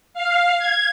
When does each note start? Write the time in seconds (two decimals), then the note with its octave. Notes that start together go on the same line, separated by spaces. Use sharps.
0.14 F5
0.59 G#6